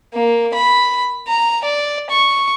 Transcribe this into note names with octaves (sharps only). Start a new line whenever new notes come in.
A#3
B5
A#5
D5
C#6